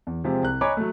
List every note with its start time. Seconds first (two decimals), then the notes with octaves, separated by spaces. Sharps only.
0.07 E2
0.24 C3 F3 G#3 C4 G4
0.43 C2 F#6
0.61 C#5 D#5 G#5 A#5 B5 D6
0.77 F#3 A3